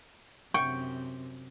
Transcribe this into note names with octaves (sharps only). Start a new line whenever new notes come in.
F#2 C3 C4 G5 C#6